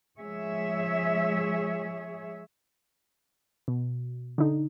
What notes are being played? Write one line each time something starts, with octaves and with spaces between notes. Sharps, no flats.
F3 G#3 G#4 C#5 E5
B2
D3 D#4